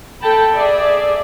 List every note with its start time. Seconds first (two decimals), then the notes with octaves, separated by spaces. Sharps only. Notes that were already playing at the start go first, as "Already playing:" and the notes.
0.22 A4 G5 A5 B5
0.53 G#4 D5 E5